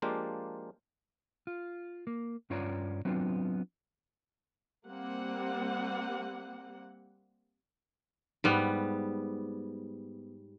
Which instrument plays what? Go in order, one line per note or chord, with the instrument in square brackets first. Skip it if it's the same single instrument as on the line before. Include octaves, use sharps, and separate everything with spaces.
[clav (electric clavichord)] F3 G#3 A#3 D4 F4 G4
[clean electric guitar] F4
A#3
G2 C#4 F4 C#5 D5 A#5
F#3 B3 C4 D4 F4
[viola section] G3 A#3 C4 F#5
[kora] G#2 G3 B3